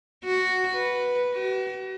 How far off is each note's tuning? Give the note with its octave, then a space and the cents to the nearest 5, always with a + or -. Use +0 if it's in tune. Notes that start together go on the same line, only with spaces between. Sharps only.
F#4 +0
B4 -5
F#4 +40